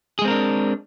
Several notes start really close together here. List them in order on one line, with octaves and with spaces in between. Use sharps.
G#4 G#3 C4 A#4 D4